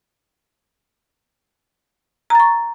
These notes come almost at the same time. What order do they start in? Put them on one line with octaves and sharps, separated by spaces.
A#5 A6 C#6